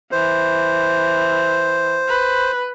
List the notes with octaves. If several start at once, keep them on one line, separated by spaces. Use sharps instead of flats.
E3 C5
B4